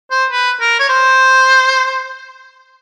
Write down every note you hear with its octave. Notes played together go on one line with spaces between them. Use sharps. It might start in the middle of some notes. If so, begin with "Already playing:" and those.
C5
B4
A#4
C#5
C5